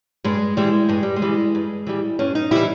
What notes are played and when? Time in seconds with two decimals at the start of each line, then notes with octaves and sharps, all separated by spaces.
0.24 G2 G#3
0.57 E3 G3 G#3
0.89 G2 G#3
1.03 G3
1.16 G#3
1.22 E3 G3
1.55 G2
1.87 E3 G3
2.19 G2 C#4
2.35 D#4
2.51 E3 G3 E4